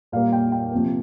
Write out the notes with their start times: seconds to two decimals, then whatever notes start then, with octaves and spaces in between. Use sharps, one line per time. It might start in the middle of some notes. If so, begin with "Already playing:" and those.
0.12 A#2 G3 A#3 F5
0.33 G5
0.52 G5
0.72 C3 F3 A#3